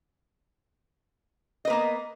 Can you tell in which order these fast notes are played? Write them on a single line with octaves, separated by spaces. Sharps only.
D#5 B4 A#3 B3